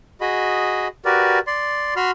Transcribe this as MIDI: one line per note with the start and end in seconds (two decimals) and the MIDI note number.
0.21 0.88 66
0.21 0.88 68
0.21 0.88 75
0.21 0.88 83
1.05 1.39 66
1.05 1.39 67
1.05 1.39 70
1.05 1.39 71
1.05 1.39 74
1.47 1.94 74
1.47 1.94 84
1.96 2.11 66
1.96 2.11 83
1.96 2.11 84
1.96 2.11 89